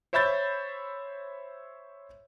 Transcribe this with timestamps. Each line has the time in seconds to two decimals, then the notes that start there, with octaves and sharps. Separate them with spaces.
0.13 C5 C#5 E5 B5 G6 A6